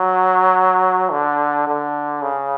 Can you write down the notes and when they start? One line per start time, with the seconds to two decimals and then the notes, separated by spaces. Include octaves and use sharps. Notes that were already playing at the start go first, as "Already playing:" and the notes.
Already playing: F#3
1.11 D3
1.67 D3
2.22 C#3